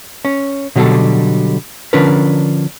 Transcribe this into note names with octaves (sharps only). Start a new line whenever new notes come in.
C#4
B2 D3 F#3 G3 D4 A4
D3 F3 C#4 D4 A#4 B4